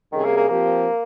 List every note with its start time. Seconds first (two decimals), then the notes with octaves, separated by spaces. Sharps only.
0.12 C3 D#3 G3 C#4 G#4
0.25 A#3
0.37 A#3
0.49 F3 A#3 C4 G4